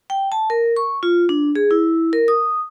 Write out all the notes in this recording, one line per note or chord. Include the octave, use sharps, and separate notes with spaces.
G5
A5
A#4
C#6
F4
D4
G#4
E4
A#4
D#6